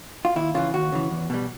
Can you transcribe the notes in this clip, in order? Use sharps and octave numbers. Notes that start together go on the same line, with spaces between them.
F4
D#2 E4
C#3 E3 F4
D#2 F#4
C#3 E3
E2
B2 G3